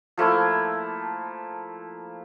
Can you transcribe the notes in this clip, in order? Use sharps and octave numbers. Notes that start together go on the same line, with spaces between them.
F3 A3 A#3 E4